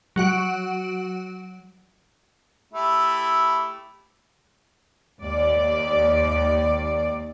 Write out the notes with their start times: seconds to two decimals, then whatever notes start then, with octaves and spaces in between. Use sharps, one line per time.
0.16 F#3 F#4 F#5 D7
2.74 A3 E4 G4
5.21 D#2 D5